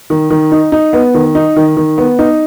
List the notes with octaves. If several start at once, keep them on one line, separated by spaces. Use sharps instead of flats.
D#3
D#3
D#4
D#4
B3
D#3
D#4
D#3
D#3
B3
D#4